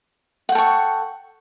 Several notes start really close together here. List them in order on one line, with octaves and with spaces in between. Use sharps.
F#5 G5 A4 C#6